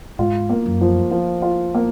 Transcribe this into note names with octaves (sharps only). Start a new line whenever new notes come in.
G#2 F4
A#3
F#2
F3
F3
F4
A#3